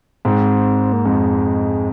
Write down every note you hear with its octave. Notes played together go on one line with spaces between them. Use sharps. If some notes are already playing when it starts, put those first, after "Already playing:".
G#2 C4
A#3
F2 G#3